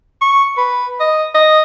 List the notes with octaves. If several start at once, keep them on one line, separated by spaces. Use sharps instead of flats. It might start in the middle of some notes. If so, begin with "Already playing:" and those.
C#6
B4
D#5
D#5